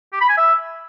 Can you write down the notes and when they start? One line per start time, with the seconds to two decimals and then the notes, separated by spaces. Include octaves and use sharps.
0.13 G4
0.21 B5
0.29 G#5
0.37 E5